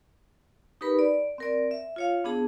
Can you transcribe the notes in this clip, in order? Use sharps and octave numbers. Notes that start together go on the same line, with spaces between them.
D#4 G4 A#4 B4 B5
D5
C4 A#4 D5
E5
F4 C#5 F5
B3 D4 G#4 A5